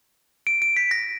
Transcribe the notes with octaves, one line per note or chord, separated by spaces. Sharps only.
D7
D7
B6
A#6